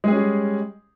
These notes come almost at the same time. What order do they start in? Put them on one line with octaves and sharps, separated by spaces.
G#3 G#4 C#4 G3